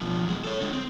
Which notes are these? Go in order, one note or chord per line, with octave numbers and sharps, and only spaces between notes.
B2 F3
E2 G#3
A4 C#5
D3 G#3
C4